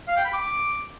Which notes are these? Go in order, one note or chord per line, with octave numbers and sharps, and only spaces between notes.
F5
G5
B5
D6